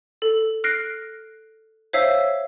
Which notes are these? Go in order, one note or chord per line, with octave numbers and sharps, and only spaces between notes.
A4
F6 F#6 A#6 C7 D7
C5 C#5 E5 F5 E6